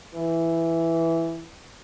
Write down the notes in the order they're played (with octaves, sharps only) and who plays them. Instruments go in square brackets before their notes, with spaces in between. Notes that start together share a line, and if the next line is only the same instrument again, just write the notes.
[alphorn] E3